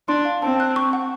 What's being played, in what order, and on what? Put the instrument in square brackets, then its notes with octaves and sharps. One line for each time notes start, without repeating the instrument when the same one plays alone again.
[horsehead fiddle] D4 [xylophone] C6
[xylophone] F5
[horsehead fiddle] C4 [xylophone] A5
[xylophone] F#6
C#6
F#5